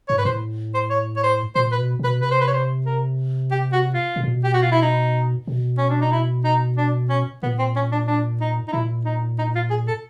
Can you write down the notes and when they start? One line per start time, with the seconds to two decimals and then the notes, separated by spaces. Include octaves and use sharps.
0.09 G#2 C#5
0.18 B4
0.25 A2 C5
0.74 C5
0.90 C#5
1.17 C#5
1.24 C5
1.55 A#2 C5
1.72 B4
1.78 B2
1.99 B2 B4
2.20 C3 B4
2.31 C5
2.41 B4
2.48 C#5
2.54 C5
2.86 A#4
3.51 G4
3.73 F#4
3.94 F4
4.16 B2
4.24 A#2
4.31 B2
4.44 G4
4.54 F#4
4.62 F4
4.72 E4
4.82 D#4
5.47 B2
5.78 C#4
5.90 D4
6.01 D#4
6.12 E4
6.44 D#4
6.77 D4
7.10 C#4
7.43 A#2 B3
7.59 C4
7.76 C#4
7.92 D4
8.08 D4
8.41 D#4
8.68 D#4
8.73 A#2 E4
9.05 D#4
9.39 D#4
9.55 F4
9.70 G#4
9.88 A4